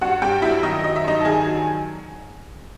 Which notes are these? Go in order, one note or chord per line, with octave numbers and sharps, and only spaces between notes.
G2 F#4 F#5
G2 G4 G5
F#3 E4 E5
D#3 D#4 D#5
F#3 D#5
E5
G2 D#4 D#5
A5
D#3 G#4 G#5
F#3